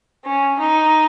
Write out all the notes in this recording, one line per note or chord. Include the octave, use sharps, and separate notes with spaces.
C#4
D#4